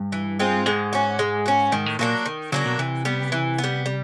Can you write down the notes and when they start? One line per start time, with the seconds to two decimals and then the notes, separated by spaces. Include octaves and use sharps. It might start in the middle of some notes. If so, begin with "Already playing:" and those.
Already playing: G2
0.12 E3
0.39 G#3 C4 F4
0.66 G#2 G#3
0.93 C#4 F#4
1.19 G#3
1.46 C#4 F#4
1.72 G#2 D#3
1.86 A2
1.99 A#2 F#3 A#3 D4
2.26 D#3
2.52 C#3 F#3 A#3 D4
2.66 B2
2.79 C3 E3
3.05 G3 B3
3.32 E3
3.58 B3
3.64 G3
3.86 G3